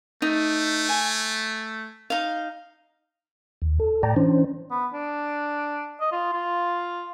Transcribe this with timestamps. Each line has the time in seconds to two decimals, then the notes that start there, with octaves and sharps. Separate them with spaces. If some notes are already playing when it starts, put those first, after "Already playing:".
0.22 A3 D#4
0.89 G#5
2.10 D#4 F5
3.62 D#2
3.80 A4
4.03 A2 D5 G5 A5 A#5
4.16 E3 C#4 D4 C5
4.71 B3
4.94 D4
6.01 D#5
6.12 F4
6.34 F4